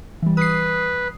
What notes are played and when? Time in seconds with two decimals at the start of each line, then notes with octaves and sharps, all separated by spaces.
0.22 E3 G3
0.37 B4 D#6 C7